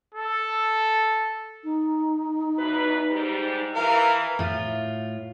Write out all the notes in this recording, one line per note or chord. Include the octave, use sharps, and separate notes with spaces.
A4
D#4
E2 B2 B4
G#2 G3 G4
E3 A#4 F5
A2 F4